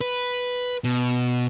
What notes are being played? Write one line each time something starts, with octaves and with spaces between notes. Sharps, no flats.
B4
B2